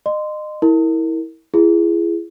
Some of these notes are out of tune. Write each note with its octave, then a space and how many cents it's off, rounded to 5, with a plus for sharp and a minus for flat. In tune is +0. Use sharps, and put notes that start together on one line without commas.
D#5 -30 C6 -15
E4 -25 A#4 -15
E4 +40 G#4 +0